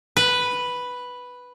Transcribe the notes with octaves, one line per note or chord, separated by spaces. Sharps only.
B4